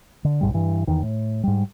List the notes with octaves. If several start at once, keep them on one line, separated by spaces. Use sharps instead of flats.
D3
B1 G#2 G3
G2 E3
E2 D#3
A2
G#2 G3